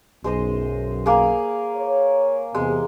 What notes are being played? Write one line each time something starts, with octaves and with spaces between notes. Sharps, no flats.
B1 F#2 G#3 C5 D#5
A#3 G#4
C#5
E2 C3 G#3